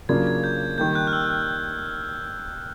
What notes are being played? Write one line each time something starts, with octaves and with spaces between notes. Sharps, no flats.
C#3 F#3 A#3 D4 F4 G#6
G#6
G6
G6
D#3 G3 A#3 G6
F#6
F6
E6
F#6
F6